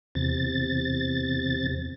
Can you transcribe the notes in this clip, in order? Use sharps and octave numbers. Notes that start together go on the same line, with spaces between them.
E2 C3 A6